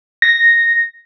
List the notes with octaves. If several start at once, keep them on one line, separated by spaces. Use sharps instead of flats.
A#6